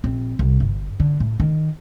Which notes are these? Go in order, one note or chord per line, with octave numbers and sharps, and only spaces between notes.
A#1 C4
C2
G1
D3
A2
D#3